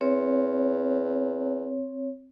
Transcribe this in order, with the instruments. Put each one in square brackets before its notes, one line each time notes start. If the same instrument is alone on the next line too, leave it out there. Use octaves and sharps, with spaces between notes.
[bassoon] E2 [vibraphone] C4 C#5